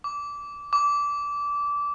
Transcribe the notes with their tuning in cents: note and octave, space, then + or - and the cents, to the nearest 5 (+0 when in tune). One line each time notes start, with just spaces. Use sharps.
D6 -20
D6 -20